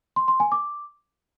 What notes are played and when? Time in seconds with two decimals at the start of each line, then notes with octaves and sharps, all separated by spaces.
0.16 C6
0.28 C6
0.40 G#5
0.52 D6